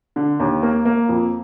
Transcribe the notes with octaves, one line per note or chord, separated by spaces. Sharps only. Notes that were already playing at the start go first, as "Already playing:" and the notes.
D3
D#2
A#3
A#3
F2